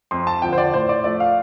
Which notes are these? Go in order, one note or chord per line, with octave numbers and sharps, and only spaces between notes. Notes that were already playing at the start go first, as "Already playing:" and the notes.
F2 C6
A5
D3 F3 G5
C5
D5
A2 C5
D5
F3 A3 D5
F5